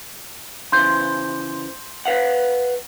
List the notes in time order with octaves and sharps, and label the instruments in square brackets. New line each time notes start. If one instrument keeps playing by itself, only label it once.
[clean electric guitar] C#3 E3 C5 [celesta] C6 G6
[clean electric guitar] B4 F5 F#5